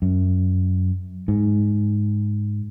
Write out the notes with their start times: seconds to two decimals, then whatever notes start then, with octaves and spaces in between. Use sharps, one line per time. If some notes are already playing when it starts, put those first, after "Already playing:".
0.02 F#2
1.28 G#2